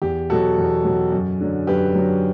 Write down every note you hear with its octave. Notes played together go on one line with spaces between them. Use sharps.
E2 G4
B2 F#3 F#4 A4
E2
B2 F#3
F#2
D3 F#3
F#2 G4 B4
D3 F#3